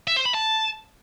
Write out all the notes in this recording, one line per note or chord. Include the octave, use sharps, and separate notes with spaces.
E5
C5
B5
A5